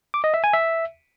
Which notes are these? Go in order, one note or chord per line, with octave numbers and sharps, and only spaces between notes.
D6
D#5
E5
G#5
E5